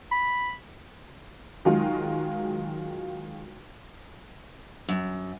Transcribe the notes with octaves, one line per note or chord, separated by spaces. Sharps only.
B5
D#3 F#3 G#3 F4 F#4
F#2